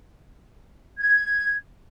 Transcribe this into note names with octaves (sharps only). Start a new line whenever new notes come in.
G#6